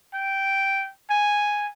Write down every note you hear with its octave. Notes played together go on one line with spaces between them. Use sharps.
G5
G#5